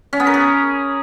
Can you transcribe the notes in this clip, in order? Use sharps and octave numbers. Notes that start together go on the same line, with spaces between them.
C#4
B3
A#4
G#4